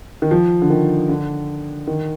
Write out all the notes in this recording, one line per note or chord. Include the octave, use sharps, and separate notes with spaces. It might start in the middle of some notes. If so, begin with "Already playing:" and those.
D#3
F3
D3
D#3
D3
D#3